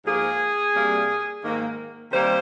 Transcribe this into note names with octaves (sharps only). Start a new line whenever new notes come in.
G#2 F3 A#3 G#4
C3 G3 A#3
G#2 D#3 A#3
C3 D#3 G3 A#3 C5